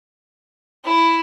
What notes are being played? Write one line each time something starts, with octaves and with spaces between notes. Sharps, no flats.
E4